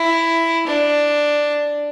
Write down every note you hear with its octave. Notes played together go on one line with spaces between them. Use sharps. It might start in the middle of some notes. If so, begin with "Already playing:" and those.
Already playing: E4
D4